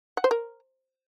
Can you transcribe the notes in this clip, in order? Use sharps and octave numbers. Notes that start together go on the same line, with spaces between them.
F#5
C5
A#4